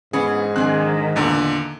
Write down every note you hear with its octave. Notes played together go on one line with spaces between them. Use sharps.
G#2 E3 B3 C#4 G#4
D#3 C4 D4 G#4 F#6
E2 A#2 D3 A3 A#5